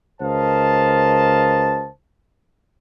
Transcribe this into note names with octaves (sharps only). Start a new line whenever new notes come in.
C#2 A#4 C5 D#5 F5 A5